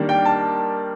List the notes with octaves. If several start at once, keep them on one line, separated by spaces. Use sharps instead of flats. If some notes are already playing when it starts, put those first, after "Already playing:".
Already playing: D#3 G3 A#3 D4
G5
A5